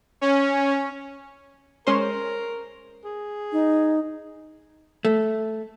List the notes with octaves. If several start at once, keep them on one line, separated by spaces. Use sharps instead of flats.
C#4
G#3 C#4 A#4 C5
G#4
D#4
A3